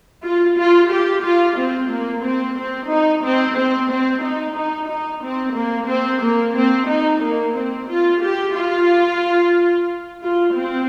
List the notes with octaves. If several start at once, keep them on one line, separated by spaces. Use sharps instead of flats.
F4
F4
G4
F4
C4
A#3
C4
C4
D#4
C4
C4
C4
D#4
D#4
D#4
C4
A#3
C4
A#3
C4
D#4
A#3
C4
F4
G4
F4
F4
C4